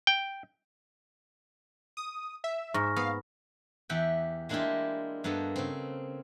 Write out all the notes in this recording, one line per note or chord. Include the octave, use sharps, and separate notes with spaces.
G5
D#6
E5
G#2 C#6 F6 A#6
B3 F5
E2 G4 E5 F#5 G5
G#3 A#3 D4 E4 F4 G4
G2 A#3 B3 A4 D#5
C#3 C4